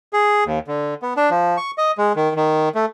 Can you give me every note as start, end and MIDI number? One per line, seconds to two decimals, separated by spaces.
0.13 0.44 68
0.46 0.59 39
0.68 0.94 50
1.02 1.14 59
1.17 1.30 62
1.30 1.57 53
1.57 1.71 85
1.78 1.92 75
1.98 2.13 56
2.16 2.33 51
2.36 2.69 51
2.75 2.86 57